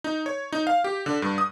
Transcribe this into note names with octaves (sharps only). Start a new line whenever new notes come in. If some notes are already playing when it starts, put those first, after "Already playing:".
D#4
C#5
D#4
F5
G4
D3
G2
D#6